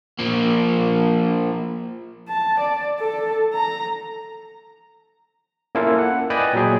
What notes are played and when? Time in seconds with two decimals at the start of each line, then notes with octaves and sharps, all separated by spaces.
0.19 F3 A#3
2.28 A5
2.61 D5
3.00 A4
3.54 A#5
5.75 A#3 C#4 E4 F4 A4 A#4
5.98 F#5
6.30 B4 D5 D#5 G5 G#5 B5
6.53 A#2 F#3 G#4